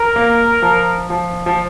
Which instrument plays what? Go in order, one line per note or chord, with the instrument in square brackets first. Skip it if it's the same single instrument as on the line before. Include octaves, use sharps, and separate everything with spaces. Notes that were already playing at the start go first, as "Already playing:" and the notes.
Already playing: [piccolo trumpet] A#4
[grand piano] A#3
F3
F3
F3